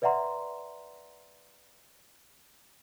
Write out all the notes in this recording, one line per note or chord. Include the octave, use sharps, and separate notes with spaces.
B4 D5 E5 F#5 A#5 C6